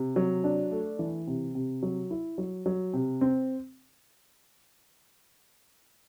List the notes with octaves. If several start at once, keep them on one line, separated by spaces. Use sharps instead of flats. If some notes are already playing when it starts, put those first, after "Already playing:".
Already playing: C3
F#3
D4
A3
E3
C3
C3
F#3
E4
F#3
F#3
C3
C4